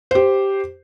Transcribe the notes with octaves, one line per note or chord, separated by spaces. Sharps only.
G4 C5